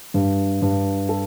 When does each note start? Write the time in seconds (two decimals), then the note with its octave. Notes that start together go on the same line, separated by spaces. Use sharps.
0.14 G2
0.62 G2
1.09 A4